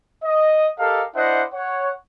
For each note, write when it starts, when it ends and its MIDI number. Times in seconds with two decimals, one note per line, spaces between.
0.24 0.67 75
0.79 1.03 67
0.79 1.03 69
0.79 1.03 70
0.79 1.03 75
0.79 1.03 77
1.15 1.43 62
1.15 1.43 64
1.15 1.43 72
1.15 1.43 75
1.15 1.43 76
1.15 1.43 78
1.54 1.91 73
1.54 1.91 78